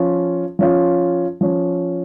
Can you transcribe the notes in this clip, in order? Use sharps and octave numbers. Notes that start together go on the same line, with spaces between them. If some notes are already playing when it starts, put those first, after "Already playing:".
Already playing: F3 C#4 F4
F3 C#4 F4
F3 C#4